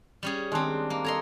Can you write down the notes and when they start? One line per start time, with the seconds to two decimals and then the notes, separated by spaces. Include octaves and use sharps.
0.23 G3 C#4 G#4
0.52 D#3 G#3 C4 D4
0.90 A#3
1.04 A4 C#5 D#5 A#5 C6